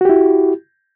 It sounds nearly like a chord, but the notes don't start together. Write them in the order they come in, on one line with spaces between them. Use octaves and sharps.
F#4 G4 E4